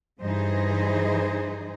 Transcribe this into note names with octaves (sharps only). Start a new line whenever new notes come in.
G2 E3 D#4 G#4 C5